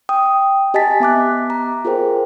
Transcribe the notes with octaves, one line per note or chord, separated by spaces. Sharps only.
G5 D#6
G4 D#5 G#5 A5 A6 B6
B3 E5 D6 F#6
A#5
F4 G#4 A#4 C5 G5